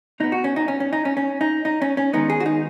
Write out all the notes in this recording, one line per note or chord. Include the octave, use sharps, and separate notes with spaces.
B2 B3 D#4
F#4
C#4
D#4
C#4
C#4
D#4
C#4
C#4
D#4
D#4
C#4
C#4
D#3 G#3 B3 D#4
G#4
F#4
D#4